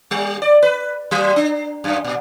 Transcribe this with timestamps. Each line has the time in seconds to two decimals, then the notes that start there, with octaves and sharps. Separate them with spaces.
0.11 G3
0.42 D5
0.62 B4
1.11 F#3
1.36 D4
1.84 F#2
2.04 A#2